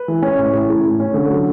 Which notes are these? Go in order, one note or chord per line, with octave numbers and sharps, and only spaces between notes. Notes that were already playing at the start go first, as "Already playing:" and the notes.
Already playing: B4
E3
C#4
A2
A2
A2
A2
C#4
D3 A4
F#3